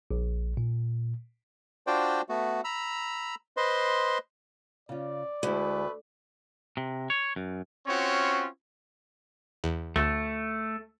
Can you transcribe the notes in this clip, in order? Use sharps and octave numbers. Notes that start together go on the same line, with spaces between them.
A#1
A#2
D4 F4 F#4 C5 D5 G5
A3 B3 F#4
A#5 B5 E6
B4 C5 D#5 C6
C#3 F4 D5
D2 G#3 A3 E4 B4
C3
C#5
F#2
C4 C#4 F4 F#4 C#5
E2
D2 A3